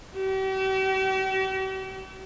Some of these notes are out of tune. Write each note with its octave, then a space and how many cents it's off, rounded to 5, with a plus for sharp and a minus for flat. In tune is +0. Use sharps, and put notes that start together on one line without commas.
G4 -45